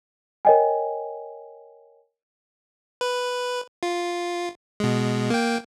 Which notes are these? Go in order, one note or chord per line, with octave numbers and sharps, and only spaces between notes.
A#4 C#5 D#5 G5 G#5
B4
F4
B2 G#3
A#3 G5